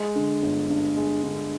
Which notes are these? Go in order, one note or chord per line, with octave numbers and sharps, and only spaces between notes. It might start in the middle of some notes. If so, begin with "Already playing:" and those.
Already playing: G#3
D3
G1
G2
G#3
D3